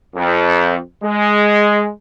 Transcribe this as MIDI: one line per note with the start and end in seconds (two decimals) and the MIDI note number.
0.15 0.76 41
1.03 1.89 56